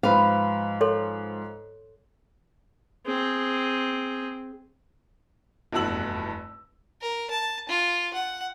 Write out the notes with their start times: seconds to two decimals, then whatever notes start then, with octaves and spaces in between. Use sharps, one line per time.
0.03 G#2 F3 B4 F5
0.81 A4 C#5 C6
3.06 C4 G#4
5.73 F1 E2 G2 F#4 E6 F#7
7.01 A#4
7.31 A5
7.69 F4
8.13 F#5